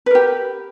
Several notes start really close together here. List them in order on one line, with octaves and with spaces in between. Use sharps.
B4 A#4 G4